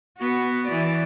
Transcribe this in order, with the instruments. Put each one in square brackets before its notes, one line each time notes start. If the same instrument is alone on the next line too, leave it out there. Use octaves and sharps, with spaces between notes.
[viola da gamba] B3 F#4
E3 D5